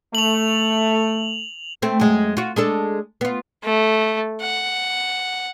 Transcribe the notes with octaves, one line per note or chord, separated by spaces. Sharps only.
A3 F7 F#7
A3 C4
F#2 G#3
F4 F#4
G#3 D4 A4
B3 F4
A3
F#5